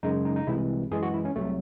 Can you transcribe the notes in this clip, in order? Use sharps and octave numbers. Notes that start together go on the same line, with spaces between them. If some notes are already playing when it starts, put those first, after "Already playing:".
F#2 C#3 G#3 D#4
D#4
D#4
C2 C3 E3 G#3 E4
F#2 E3 G#3 G#4
F#4
E4
C#4
C2 C3 F#3 A3